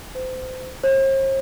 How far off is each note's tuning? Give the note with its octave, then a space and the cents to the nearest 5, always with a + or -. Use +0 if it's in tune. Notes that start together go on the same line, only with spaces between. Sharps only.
C5 -30
C5 +45